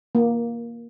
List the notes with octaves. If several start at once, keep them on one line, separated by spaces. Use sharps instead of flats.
A#3